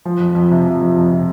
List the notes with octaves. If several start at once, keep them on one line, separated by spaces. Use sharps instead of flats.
F3
F2
F2
C3
F3
F2
F2
C3